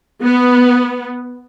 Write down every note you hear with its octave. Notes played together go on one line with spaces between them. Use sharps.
B3